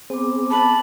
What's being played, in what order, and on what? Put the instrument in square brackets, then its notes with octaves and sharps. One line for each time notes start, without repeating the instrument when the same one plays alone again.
[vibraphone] B3 D6 [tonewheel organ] C4 G#4 C5
[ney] A5 [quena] B5